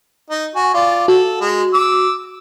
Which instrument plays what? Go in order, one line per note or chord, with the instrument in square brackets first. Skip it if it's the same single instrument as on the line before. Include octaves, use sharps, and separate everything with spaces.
[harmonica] D#4
F#4 G#5
F4 D5
[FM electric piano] F#4 [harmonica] A4
[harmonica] G#3
D6 E6